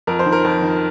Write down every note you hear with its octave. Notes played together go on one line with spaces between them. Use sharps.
F2 A#4
C5
D#3
A#4
F2
D#3